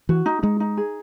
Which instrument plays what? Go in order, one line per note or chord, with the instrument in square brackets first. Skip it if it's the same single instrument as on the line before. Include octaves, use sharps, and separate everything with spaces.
[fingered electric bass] E3 [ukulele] F#4
[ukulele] D#4
[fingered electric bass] G#3 [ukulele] D#4
[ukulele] D#4
G#4